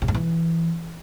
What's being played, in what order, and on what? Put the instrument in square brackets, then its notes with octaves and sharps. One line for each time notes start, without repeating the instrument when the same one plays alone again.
[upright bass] C#3
G2
E3